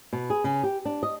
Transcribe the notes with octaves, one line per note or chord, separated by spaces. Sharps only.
B2
G#4
C#3
G4
D4
D#5